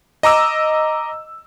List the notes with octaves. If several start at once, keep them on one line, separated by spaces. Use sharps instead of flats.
D#5 A#5 D6 E6